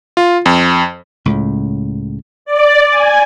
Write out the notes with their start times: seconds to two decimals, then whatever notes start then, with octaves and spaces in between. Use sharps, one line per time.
0.17 F4
0.46 F2
1.26 C#2 A2 C#3
2.45 D5
2.91 G#5